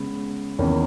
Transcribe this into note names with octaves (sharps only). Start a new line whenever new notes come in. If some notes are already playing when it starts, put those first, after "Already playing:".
Already playing: C#3 G#3 B3
E2 D#3 A#3 C#4